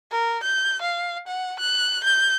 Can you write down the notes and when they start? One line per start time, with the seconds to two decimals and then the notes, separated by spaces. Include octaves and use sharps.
0.11 A#4
0.43 G6
0.82 F5
1.28 F#5
1.60 F#6
2.04 G6